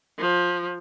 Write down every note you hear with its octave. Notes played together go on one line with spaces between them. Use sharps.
F3